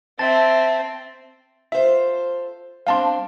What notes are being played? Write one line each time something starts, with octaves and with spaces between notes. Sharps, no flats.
C4 E5 A5 A6
F4 A4 C5 E5
G3 C4 D4 F5 A5 C6